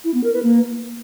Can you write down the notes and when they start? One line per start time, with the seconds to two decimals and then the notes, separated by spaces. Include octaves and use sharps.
0.04 E4
0.14 B3
0.24 A#4
0.33 B4
0.43 A#3